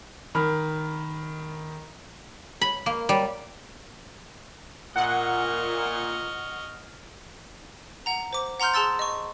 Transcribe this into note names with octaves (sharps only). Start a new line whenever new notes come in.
D#3 B5 F6
B5
A#3
G3
A#2 D#5 F#5 C#6 F6
F#5 A#5
C5 D6
F#5 A#5 C6 F6 G6
G#4 A5 C6 E6 A6
D#5 C#6